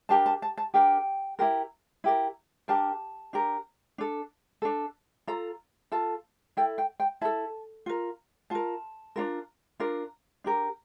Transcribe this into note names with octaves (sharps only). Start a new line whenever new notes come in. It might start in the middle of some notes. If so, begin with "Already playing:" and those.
D4 G4 A#4 A5
A5
A5
A5
D4 G4 A#4 G5
E4 G4 A#4
E4 G4 A#4
D4 G4 A#4 A5
D4 G4 A#4
D4 A4
D4 A4
F4 A4 A#5
F4 A4 A5
E4 A4 G5
G5
G5
E4 A4 A5
F4 A#4
F4 A#4 A5
D4 F4 A#4
D4 F4 A#4
D4 G4 A#4